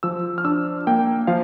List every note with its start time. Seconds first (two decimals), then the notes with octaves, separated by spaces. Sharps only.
0.03 F3 E6
0.38 F6
0.44 D4 E6
0.87 A#3 G5
1.27 F3 F5